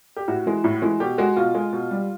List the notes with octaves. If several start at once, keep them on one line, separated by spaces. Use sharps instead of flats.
G4
A2 F#4
E3 G#3
A2
E3 G#3
B2 G4
G#3 F#4
B2 F4
G#3
B2
G3